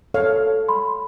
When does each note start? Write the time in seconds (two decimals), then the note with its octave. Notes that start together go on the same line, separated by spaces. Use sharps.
0.14 A4 C#5 F5
0.68 B5 C6